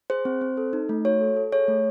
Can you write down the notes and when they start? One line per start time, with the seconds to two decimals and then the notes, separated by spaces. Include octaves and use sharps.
0.10 G#4 C5
0.25 C4
0.41 C4
0.57 A4
0.73 D#4
0.89 A3
1.05 F#4 C#5
1.21 A4
1.36 A4
1.52 G#4 C#5
1.68 A3